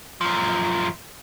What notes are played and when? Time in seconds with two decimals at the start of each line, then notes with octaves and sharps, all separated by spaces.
0.21 F#2 F3